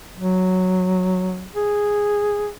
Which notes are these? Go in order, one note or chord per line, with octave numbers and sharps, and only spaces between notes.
F#3
G#4